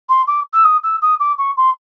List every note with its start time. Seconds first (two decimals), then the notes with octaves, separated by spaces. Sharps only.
0.09 C6
0.27 D6
0.53 E6
0.64 D#6
0.83 E6
1.02 D#6
1.20 D6
1.38 C#6
1.57 C6